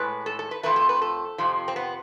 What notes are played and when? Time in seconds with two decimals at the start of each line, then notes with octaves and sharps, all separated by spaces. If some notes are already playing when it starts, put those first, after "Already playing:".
Already playing: A2 G#3 B4
0.26 A4
0.39 A4
0.51 B4
0.63 F2 C3 F3 A3 B4
0.76 A4
0.89 B4
1.02 A4
1.38 F2 C3 F3
1.68 C4
1.76 B3